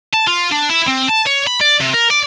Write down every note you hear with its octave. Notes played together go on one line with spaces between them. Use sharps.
A5
F4
D4
E4
C4
A5
C#5
B5
D5
C3
A#4
D5